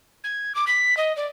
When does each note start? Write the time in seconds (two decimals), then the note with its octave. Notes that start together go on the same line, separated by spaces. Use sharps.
0.24 G#6
0.55 D6
0.67 B6
0.97 D#5
1.17 D5